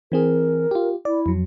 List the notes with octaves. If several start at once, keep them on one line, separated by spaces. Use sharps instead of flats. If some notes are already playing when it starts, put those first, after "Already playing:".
E3 C4 G#4 A#4
F4 G4
E4 D5
F2 F#3